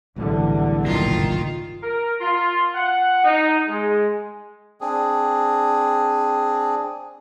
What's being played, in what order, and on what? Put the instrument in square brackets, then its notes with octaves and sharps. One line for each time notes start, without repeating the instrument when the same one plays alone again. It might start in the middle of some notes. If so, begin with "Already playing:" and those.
[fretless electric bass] B1 A2 [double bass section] E2 D3 G3
[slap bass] F#1 G2 A#2 [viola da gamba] D#3 F4
[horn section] A#4
F4
F#5
D#4
G#3
[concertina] C4 D4 G#4